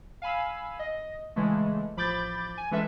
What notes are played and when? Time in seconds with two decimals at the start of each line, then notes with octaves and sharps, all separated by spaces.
0.22 F5 G#5 B5 E6
0.79 D#5
1.36 C#3 E3 G#3 A3
1.96 A1 F3 B5 D6 G6 A6
2.58 G#5
2.71 E3 G#3 C#4 A4 B4 E5